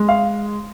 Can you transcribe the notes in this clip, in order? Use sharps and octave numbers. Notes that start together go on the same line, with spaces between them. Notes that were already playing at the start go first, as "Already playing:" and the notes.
Already playing: G#3
F5